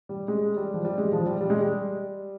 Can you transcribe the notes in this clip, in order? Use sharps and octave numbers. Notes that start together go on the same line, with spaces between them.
G3
G#3
G3
F3
G3
G#3
F3
G3
G3
G#3
G3